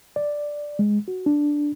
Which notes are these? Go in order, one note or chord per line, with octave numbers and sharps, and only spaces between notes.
D5
G#3
F#4
D4